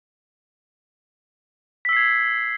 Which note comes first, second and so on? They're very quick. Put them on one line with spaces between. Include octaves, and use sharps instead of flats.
B6 E6 C7 G#6